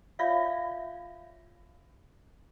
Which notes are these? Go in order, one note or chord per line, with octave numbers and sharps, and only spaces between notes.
F4 C#5 D5 E5 F5